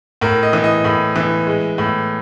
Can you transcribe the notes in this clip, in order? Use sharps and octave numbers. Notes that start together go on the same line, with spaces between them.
A2 A#4
D#5
E3
D#5
A2
E3
G#3
A2